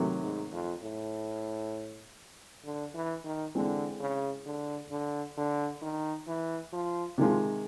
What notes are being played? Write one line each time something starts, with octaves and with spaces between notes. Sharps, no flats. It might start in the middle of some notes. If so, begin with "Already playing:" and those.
Already playing: C3 D#3 F#3 A3
G#2
F2
A2
D3
E3
D#3
D3 E3 G#3 C4
C#3
D3
D3
D3
D#3
E3
F3
C3 D#3 F3 G#3